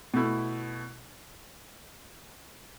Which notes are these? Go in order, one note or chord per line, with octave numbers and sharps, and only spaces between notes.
B2 A3 E4